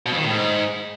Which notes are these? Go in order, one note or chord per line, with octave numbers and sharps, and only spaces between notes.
B2
F2
D#3
A2
G#2